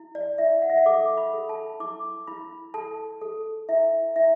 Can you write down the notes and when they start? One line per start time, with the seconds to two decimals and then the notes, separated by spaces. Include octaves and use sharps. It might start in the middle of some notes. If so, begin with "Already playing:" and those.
Already playing: E4
0.15 D5
0.38 E4 E5
0.62 F#5
0.70 E5
0.77 F#5
0.86 A4 D6
1.18 B5
1.34 A4
1.49 A5
1.80 E4 D6
2.27 E4 B5
2.74 A4 A5
3.21 A4
3.69 E4 E5
4.16 E4 E5